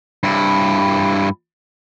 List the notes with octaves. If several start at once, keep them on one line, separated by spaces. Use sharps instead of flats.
G2 E4